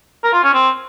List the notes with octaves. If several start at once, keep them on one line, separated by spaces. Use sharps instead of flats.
A#4
F4
C#4
C4